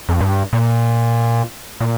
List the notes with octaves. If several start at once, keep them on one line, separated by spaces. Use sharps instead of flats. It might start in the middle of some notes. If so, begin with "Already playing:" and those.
F2
G2
A#2
A#2